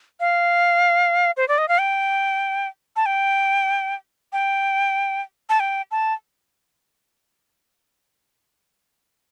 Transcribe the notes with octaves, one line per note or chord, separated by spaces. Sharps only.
F5
C5
D5
D#5
F5
G5
A5
G5
G5
A5
G5
A5